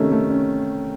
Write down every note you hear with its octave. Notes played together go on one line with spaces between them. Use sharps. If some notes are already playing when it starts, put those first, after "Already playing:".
Already playing: C3 D#3 A3 C#4
A3
C#4